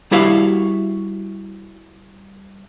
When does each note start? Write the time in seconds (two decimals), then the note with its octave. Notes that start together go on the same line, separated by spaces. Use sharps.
0.11 G3 E4 F#4 E5 F5